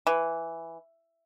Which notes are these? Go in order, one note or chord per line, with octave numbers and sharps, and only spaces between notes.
E3